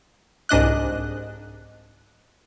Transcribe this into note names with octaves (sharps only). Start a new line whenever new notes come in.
C2 G#2 D4 D#5 F#6